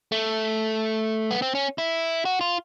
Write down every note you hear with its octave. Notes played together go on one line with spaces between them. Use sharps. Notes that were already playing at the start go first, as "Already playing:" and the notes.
A3
B3
C4
C#4
E4
F#4
F4